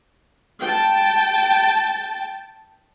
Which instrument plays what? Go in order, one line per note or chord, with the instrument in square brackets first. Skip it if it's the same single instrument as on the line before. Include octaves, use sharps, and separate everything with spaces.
[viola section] G5 A5